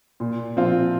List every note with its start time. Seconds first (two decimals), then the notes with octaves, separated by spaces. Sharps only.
0.20 A#2
0.57 F3 C4 F4